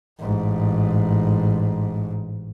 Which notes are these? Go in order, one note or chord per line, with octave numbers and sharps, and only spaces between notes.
A1 G#2